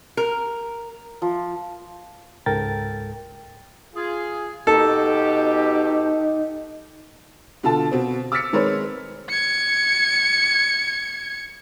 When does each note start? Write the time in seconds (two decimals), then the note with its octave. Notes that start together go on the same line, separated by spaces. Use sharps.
0.17 A#4
1.22 F3
2.46 C#2 G#2 A4 A#4 G5 A6
3.94 F4 G#4
4.67 B2 D#4 G4 A4
7.63 B2 D3 F4 A4 A5
7.92 B2 C4
8.32 D6 E6 F6 A6 B6 C#7
8.53 D#3 G#3 C4 A#4 B4 C#5
9.29 G#6 C#7